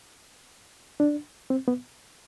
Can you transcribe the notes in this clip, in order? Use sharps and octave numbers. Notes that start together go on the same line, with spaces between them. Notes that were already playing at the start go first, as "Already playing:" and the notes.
D4
C4
B3